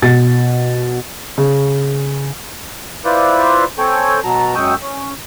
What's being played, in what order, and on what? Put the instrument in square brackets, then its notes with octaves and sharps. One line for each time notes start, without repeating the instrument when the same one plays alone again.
[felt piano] B2 A6
[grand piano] C#3
[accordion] E4 F4 B4 C5 D5
C4 A4 C#5 G5 G#5
B2 F#3 A5 A#5
F#2 G#3 G5 C#6 D#6 E6
C#4